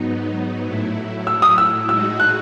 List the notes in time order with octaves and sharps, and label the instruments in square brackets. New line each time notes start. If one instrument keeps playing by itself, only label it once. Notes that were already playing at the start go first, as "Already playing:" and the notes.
Already playing: [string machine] G#2 F#3 B3 D#4
A2 F#3 A3 E4
[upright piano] E6
D#6
E6
[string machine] A2 G#3 D#4 F#4 [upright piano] E6
[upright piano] F#6